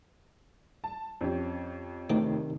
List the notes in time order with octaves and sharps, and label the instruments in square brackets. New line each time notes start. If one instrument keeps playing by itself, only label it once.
[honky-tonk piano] A5
F2 C#4 G4
[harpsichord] D2 D4 D6 [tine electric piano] C3 D#3 D#4